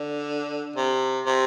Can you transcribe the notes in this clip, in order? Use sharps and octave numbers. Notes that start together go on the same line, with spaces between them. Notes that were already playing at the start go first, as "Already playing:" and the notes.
Already playing: D3
C3
C3